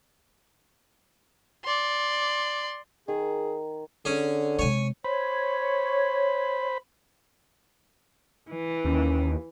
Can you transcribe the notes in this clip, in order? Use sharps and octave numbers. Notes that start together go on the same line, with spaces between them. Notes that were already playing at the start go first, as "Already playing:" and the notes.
D5 C6
D#3 G#4
D3 C#4 G#4
C3 G#3 C#5 G#5
C5 C#5 B5
E3
D#2 C#4